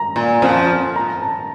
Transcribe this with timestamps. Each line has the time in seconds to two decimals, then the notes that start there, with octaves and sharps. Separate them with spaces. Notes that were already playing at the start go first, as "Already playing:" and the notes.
Already playing: A#5
0.16 A#2
0.42 F2 F3
0.96 A#5
1.22 A5